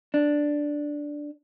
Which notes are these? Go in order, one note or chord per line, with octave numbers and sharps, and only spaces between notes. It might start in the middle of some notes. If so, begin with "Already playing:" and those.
D4